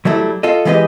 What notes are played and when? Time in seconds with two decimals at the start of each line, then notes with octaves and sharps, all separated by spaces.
0.05 F#3 G3 A3 E4
0.43 F4 A4 D#5
0.65 E3 G#3 B3 G4 B4 D#5